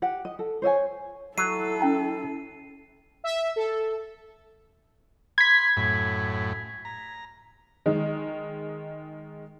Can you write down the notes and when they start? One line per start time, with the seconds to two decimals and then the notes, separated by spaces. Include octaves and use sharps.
0.02 G4 F#5
0.25 D#5
0.39 A4
0.62 C5 C#5 E5 G#5
1.38 F#3 E4 A4 C7 D#7
1.81 C#4 G5 A#5
3.24 E5
3.56 A4
5.38 B5 C6 G#6 B6
5.77 F#2 A2
6.85 A#5
7.86 D#3 G#3